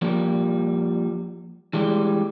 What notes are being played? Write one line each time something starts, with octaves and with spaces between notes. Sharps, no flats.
F3 G3 A#3
E3 G3 G#3